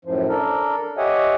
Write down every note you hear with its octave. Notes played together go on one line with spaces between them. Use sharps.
F#2 A2 F3
D4 A4 A#4
G4 C#5 D#5 E5 F#5 G#5